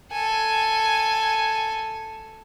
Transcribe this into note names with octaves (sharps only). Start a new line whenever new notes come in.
A4 G#5